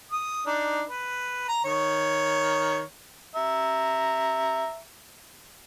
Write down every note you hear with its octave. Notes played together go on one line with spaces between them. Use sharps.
D#6
D4 D#4
B4
A#5
D#3 C#5
E5 A#5